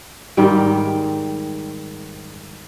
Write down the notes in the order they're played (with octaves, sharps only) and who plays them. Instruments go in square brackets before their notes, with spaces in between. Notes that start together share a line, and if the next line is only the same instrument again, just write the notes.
[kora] G#2 D#3 G3 G5